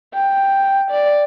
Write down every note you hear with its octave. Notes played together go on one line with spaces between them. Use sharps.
G5
D5